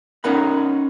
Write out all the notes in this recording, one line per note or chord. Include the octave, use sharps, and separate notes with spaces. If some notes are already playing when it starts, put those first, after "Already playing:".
C#4 D#4 A#4 F#5 B5